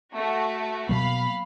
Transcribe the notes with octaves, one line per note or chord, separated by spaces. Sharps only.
A3 F#4
B2 F#3 A#3 F5 B5